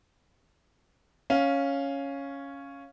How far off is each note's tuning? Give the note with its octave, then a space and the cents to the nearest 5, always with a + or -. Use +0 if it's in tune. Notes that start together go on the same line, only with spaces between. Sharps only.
C#4 +0 F5 +0